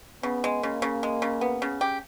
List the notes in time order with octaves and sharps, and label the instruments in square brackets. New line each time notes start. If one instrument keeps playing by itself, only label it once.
[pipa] C#3 [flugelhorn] B3
[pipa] G#3
[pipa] C#3 [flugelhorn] A#3
[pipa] C#3
G#3
C#3
B3
C#3
G4